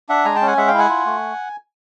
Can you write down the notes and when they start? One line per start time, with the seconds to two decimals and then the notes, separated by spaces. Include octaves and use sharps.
0.09 D4 E5 F#5
0.25 G#3 G#5 A#5
0.36 G5 A5
0.41 C#4
0.47 F#5 G#5
0.57 G#3 E5 F#5
0.68 F5 G5
0.73 E4
0.78 F#5 G#5
0.89 F4
1.06 A3